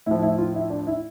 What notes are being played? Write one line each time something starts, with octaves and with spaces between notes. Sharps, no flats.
A2 F3 E4
E4
F4
E4
D4
E4